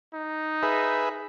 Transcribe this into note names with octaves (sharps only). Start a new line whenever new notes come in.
D#4
G#4 B4 E5